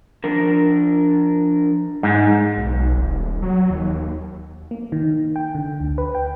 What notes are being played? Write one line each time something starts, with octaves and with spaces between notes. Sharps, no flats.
F3 D4 A#4
G#2
B1
D#1
F#3
D#2
A#3
D#3
G5
D3
D2
B4
G5